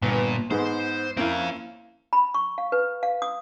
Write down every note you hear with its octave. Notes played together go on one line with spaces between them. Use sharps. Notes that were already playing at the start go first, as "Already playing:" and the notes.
G1 A#2 B3
G#2 B3 G#4 C5
A#3 C4 C#4 E4 F5
B5
C#6
F5
B4
F5
D#6